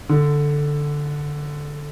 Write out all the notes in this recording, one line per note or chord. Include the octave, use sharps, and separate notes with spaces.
D3